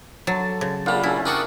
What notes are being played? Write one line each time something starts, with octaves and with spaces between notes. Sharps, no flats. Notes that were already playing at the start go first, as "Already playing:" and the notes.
D3 F#3 A5
C#3
A#1 F#2 G3 F4 A4 F#5
F#3 A3 C#4 E4
C4 D4 F#4 A#4 C#6 D#6 F#6